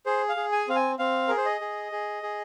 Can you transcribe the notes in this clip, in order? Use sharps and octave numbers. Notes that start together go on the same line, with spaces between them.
G#4 C5
F5
G#4
G#5
C4 F5
G#5
C4 F5
G#4 A#4
C5
D#5
G#4
G#4
G#4